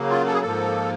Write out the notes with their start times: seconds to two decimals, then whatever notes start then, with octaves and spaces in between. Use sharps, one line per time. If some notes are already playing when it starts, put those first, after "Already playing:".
Already playing: C#3 F#3 A#3
0.10 F4
0.26 A4
0.33 G#4
0.42 G#2 F3 A#3 A4